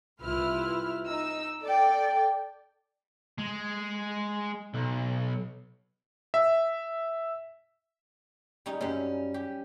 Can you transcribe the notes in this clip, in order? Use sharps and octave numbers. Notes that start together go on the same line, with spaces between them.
C2 E4 F4 B4 F6
D#4 E6
A4 D5 G5
G#3
B1
E5
G3 C#4 D#4
F#2 G3 C#4
G4